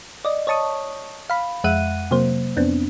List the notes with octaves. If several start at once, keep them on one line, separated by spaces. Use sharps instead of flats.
D5 D#5
C#5 D#5 A5 C#6 D#6
F5 B5
F2 G#3 E5 F#5 F#6 D#7
C3 F#3 A#3 C5
F2 B3 C4 D4